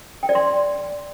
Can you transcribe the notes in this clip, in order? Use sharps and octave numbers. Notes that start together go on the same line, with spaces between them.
G5
D5
C6